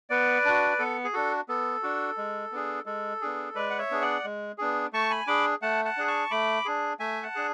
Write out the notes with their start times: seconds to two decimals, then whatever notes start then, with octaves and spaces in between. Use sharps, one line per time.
0.10 B3 B4 D5
0.45 D4 F#4
0.79 B3 A4
1.04 G#4
1.13 D4 F#4 A4
1.49 B3 A4
1.83 D4 F#4
2.18 G#3
2.52 B3 D4 G#4
2.86 G#3 A4
3.21 B3 D4 G#4
3.55 G#3 B4 D5
3.70 F#5
3.78 C#5 E5
3.90 B3 D4 G#4
4.02 D5 F#5
4.24 G#3
4.58 B3 D4 G#4
4.93 A3 A5 C#6
5.10 G#5 B5
5.27 D4 G#4 B5 D6
5.62 A3 F#5 A5
5.85 F#5 A5
5.97 D4 G#4
6.08 A5 C#6
6.31 A3 B5 D6
6.65 D4 G#4
7.00 A3 E5 G#5
7.23 F#5 A5
7.35 D4 G#4